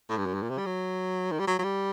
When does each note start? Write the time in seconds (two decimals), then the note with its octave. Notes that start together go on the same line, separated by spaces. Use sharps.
0.10 A2
0.18 G2
0.26 F#2
0.34 G2
0.42 A#2
0.50 C3
0.58 G3
0.66 F#3
1.31 D#3
1.39 G3
1.47 F#3
1.59 F#3
1.64 G3